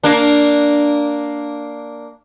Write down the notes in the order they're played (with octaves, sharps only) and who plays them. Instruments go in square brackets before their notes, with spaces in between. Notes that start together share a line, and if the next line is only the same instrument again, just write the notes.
[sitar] A#3 D4